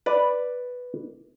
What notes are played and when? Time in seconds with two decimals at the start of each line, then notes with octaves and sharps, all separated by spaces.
0.06 B4 D5